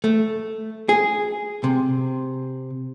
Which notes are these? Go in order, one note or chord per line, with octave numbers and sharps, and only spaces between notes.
A3
G#4
C3